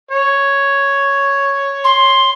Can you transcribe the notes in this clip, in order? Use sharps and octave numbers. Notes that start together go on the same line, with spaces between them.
C#5
C6